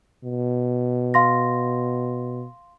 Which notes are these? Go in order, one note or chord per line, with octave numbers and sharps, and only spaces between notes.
B2
F5 C6 A#6